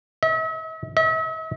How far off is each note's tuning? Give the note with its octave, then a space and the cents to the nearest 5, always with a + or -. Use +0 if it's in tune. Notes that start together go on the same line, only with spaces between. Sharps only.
E5 -45
E5 -45